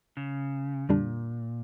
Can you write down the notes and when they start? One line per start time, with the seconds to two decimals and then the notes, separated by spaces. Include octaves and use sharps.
0.17 C#3
0.89 F2 A#2 D3 G3 D4